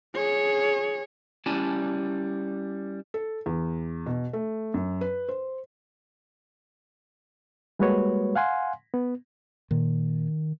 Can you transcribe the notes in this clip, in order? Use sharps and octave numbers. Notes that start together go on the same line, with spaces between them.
G#4 C#5
G3 C#4 E4 D5 G#5 A5
A4
E2
B2
A3
F#2
B4
C5
G3 G#3 A#3 F#4 B4 C#5
F5 F#5 G#5 C6
B3
A#2 D#3